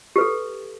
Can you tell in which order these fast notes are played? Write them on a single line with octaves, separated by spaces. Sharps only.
G4 B4 A4